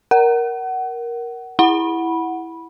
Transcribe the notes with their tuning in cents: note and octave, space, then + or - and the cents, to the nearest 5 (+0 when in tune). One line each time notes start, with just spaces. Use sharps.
A#4 +10 F#5 +25
E4 +0 F#5 +0 B5 -15